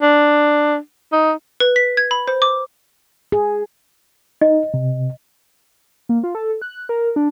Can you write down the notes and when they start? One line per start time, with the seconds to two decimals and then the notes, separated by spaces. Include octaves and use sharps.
0.02 D4
1.12 D#4
1.60 B4
1.76 B6
1.97 G#6
2.11 B5
2.28 C5
2.42 D6
3.32 G#4
4.41 D#4 D#5
4.74 C3
6.09 A#3
6.24 F4
6.35 A4
6.62 F#6
6.89 A#4
7.16 D4